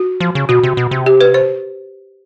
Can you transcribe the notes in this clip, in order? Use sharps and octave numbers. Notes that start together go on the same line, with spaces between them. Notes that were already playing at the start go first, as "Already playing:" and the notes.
Already playing: F#4
F3
C#3
B2 F#4
C3
B2
C3
G4
B4
C5